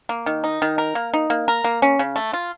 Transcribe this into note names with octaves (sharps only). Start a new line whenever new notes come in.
A#3
D#3
D#4
D#3
A#4
A#3
D#4
A#3
A#4
A#3
C#4
C#3
A3
F4